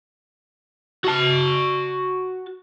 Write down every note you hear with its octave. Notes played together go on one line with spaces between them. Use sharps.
F#4 A5